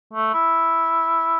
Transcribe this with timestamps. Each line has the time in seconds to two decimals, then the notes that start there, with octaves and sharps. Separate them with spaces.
0.13 A3
0.33 E4